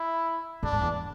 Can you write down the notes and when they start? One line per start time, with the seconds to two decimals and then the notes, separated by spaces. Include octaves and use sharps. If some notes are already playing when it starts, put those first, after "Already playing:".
Already playing: E4
0.63 A2 D4
0.72 G#2
0.81 E2